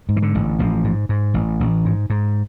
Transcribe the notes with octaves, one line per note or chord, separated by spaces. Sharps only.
G#2
E3
D3
A1
A1 F3
G#2
G#2
A1
A1
G#2
G#2